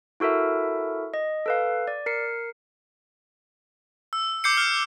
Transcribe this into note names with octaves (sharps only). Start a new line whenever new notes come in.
E4 F#4 A4 A#4 E5
D#5
A4 B4 F5
D5
A#4 C7 C#7
E6
D6 G6 C7 C#7
F6